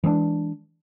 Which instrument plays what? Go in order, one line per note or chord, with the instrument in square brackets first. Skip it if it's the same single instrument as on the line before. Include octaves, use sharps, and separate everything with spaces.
[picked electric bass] E3 G#3 B3 D4